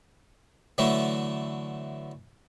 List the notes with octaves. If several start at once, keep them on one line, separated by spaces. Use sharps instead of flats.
D3 E3 F#3 A3